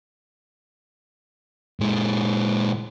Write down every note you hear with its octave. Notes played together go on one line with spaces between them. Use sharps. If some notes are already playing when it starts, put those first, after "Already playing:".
A#2 G#3